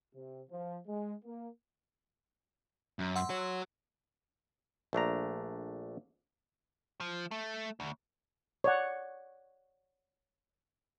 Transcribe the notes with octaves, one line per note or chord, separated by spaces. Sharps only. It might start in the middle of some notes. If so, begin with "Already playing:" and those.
C3
F3
G#3
A#3
F#2
F#5 C6 E6
F#4 C#5
A#1 A3 D4 A#5
F3
A3
D2
C#5 D5 F#5